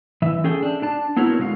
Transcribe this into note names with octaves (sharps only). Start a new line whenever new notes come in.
E3 E5
C#4 G#4 A4 G5
D4
D4 A5
B3 C4 E4 F#4 A#4 C#5
D3 G#3 F#4 E5 F5